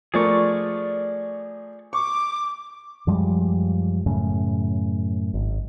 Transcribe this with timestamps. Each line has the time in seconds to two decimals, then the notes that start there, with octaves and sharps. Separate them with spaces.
0.14 F3 A3 G#4 A#4 D5 C#6
1.93 C#6 D6
3.07 F#2 F3 G3 G#3
4.06 F#2 A2 C#3
5.34 G#1